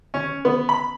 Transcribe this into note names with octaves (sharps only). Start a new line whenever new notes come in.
C#4
B3
B5